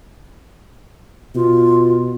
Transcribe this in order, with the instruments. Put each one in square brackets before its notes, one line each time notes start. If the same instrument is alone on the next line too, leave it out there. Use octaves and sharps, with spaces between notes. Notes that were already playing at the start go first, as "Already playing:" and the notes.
[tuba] B2 [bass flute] F4